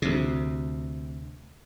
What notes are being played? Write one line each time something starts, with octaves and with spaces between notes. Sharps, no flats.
D2 C3